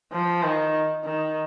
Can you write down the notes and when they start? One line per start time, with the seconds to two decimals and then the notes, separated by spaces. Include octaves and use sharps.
0.12 F3
0.43 D#3
1.05 D#3